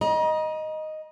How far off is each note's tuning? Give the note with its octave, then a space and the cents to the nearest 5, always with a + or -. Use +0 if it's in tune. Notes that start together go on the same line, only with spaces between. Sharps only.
D#5 +0 A#5 +40